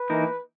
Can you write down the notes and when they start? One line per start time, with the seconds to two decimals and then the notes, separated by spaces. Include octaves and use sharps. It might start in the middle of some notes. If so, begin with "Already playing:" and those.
Already playing: B4
0.10 E3 A#3 D#4 A#4